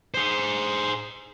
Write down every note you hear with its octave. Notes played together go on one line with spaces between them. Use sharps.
G#4 C5